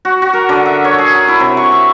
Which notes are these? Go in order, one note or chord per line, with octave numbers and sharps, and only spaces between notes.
F#4
F#4
A#4
D3
E5
C#5
G#4
G#4
E4
C3
C#6
E5